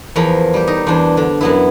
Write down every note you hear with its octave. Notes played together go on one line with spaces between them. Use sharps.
E2 F3 A#4 A#5 B5
G3 G4
D#4
E2 D4 C5
D3
F#2 B3 E4